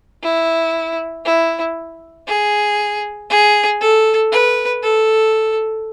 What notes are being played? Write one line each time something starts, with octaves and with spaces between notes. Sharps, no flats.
E4
E4
G#4
G#4
A4
B4
A4